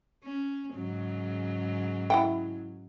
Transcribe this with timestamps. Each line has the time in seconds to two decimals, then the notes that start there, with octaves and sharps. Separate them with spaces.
0.24 C#4
0.74 G#2 C#3 F#3
2.10 E4 F#5 G5